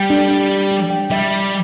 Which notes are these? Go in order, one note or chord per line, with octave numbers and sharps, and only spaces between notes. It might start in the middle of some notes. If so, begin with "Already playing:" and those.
Already playing: G3 G5
D4
G5
D4
D4
G5
G3 E5